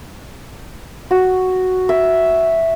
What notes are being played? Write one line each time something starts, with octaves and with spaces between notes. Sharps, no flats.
F#4
E5